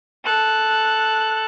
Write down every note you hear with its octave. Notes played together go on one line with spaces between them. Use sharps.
A4 F#6